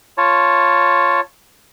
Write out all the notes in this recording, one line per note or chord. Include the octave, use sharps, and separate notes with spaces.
F4 C#5 A5